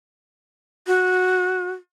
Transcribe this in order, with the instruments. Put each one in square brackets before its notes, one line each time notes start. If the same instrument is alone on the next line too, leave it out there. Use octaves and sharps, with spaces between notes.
[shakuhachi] F#4